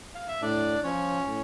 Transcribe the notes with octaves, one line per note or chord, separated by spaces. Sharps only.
F5
E5
A2 D4 D5
F3 C#4 C#5
A2